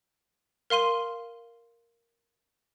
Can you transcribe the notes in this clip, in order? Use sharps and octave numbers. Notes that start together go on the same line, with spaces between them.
A#4 F5 C6 D#7 G7